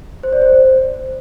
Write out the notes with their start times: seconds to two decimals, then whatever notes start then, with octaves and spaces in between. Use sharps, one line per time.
0.23 C5
0.33 D5
0.42 C5